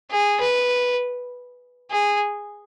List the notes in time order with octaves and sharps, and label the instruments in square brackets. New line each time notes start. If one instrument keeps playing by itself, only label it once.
[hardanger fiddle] G#4
B4
G#4